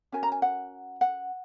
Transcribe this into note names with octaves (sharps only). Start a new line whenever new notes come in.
C#4 F#4 A#4 G#5
A#5
G#5
F#5
F#5